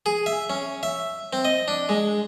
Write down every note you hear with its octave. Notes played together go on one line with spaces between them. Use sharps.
G#4
E5
C#4
E5
C4
D#5
D4
G#3